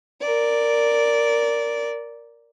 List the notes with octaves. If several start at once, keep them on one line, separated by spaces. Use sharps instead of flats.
A#4 D5